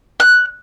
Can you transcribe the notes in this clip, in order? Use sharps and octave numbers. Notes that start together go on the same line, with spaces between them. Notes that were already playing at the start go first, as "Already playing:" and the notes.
F#6